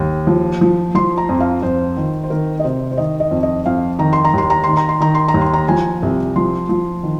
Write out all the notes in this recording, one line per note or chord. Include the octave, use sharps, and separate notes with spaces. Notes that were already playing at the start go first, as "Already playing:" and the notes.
Already playing: D#2
F3
F3
F3 C6
A#5
F2
F5
F2 C5
D#3
C5
D#3 A#4
D#5
C3 C5
C5
D#3 D#5
D#5
F2
D#5
F2 F5
D#3 A#5
C6
A#5
D#2 C6
A#5
D#3 C6
A#5
C6
D#3 A#5
C6
A#5
D#2
C6
A#5
F3 G#5
C2
F3 C6
F3
D#3